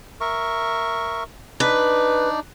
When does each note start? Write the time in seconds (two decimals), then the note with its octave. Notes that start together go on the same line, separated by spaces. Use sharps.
0.21 A#4 E5 C#6
1.60 D4 D#4 B4 D5